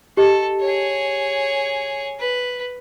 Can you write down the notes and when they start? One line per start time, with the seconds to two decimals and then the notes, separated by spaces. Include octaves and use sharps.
0.17 G4 A4 D#5
0.60 G#4 C#5
2.19 B4